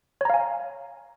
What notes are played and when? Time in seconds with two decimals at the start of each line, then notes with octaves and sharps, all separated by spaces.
0.21 C#5
0.25 A#5
0.30 F5
0.34 G#5